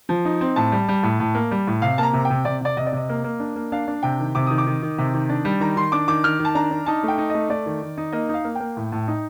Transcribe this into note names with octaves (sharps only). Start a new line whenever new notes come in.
F3
D#4
C4
A2 A5
G3
G3
A2
A2
A#3
G3
A2
C3 F5
A#3 A5 A#5
C3
G5
C3
C3 D5
C3 D5
C3 D#5
D5
C3 D#5
A#3
A#3
D4
A#3
D4 F5
D4
C3 G5
D#3
C3 D6
D#3 D#6
D6
D#3
D#3
C3
D#3
D4
G3
D#3 A#5
D#3 C6
D4 D6
D#3 D6
D#3 F6
D#3
A5
D4 A#5
D4
D#4 A5
A3 G5
D#4
A3 D#5
A3 D5
D#3
D#3
D#4
A#3 D#5
D#4 F5
A#3
A#3 G5
A2
A2
D#4